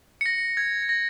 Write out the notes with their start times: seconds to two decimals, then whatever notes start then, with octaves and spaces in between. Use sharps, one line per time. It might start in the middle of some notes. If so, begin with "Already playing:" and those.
0.21 C#7
0.26 A#6
0.57 G#6
0.82 C#7
0.89 A#6